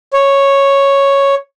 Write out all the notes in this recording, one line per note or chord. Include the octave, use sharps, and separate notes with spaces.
C#5